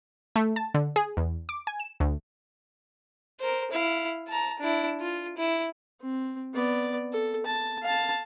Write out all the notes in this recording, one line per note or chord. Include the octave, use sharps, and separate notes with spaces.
A3
A5
D3
G#4
E2
D6
G#5
E7
D2
A#4 C5
E4 F5
A5 A#5
D4 E4
F4
E4
C4
B3 D5
A4
A5
F5 A5